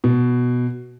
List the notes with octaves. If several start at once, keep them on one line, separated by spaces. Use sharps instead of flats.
B2